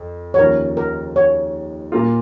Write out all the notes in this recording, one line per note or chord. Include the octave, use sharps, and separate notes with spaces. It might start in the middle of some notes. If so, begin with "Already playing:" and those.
Already playing: F2
C#5
D#2 C#3 F3 A#4
A#4
C#5
A#2 A#3 F4